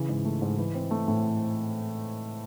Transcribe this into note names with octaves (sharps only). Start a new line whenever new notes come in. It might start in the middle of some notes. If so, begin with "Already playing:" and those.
Already playing: C#3 E3
G#2
A3
G#2
E3
C4
A3
A2